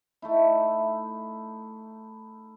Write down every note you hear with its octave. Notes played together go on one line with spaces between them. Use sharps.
A3 D#4 E4